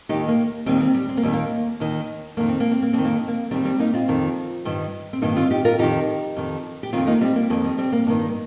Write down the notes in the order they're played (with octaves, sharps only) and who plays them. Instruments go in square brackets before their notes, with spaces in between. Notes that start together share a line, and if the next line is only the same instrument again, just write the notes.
[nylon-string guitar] D#2 D#3 D#4 G4
A#3
D#2 D#3 G3 C4
G3 C4
G3
C4
A#3
D#2 D#3 G3
A#3
D#2 D#3
F2 D#3 A#3
C4
A#3
C4
A#3
F2 D#3 C4
A#3
C4
A#3
F2 D#3 G3 C4
G3 C4
A#3 D#4
C4 F4
F2 D#3
G2 D#3
C4
G2 D#3 A#3 D#4
C4 F4
D#4 G4
F4 A#4
F2 D#3 D#4 G4
F2 D#3
G4
F2 D#3 C4 F4
A#3 D#4
G3 C4
A#3
F2 D#3 A#3
G3 C4
G3 C4
A#3
G2 D#3 A#3